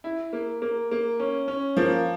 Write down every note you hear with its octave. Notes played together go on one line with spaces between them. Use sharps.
E4
A#3
A#3
A#3
C#4
C#4
F3 A#3